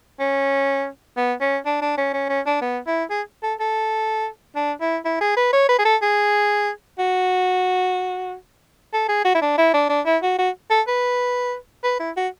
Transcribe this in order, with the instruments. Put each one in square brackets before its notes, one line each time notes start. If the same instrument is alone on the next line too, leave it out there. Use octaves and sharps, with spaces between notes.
[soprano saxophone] C#4
B3
C#4
D4
D4
C#4
C#4
C#4
D4
B3
E4
G#4
A4
A4
D4
E4
E4
G#4
B4
C#5
B4
G#4
A4
G#4
F#4
A4
G#4
F#4
E4
D4
E4
D4
D4
E4
F#4
F#4
A4
B4
B4
E4
F#4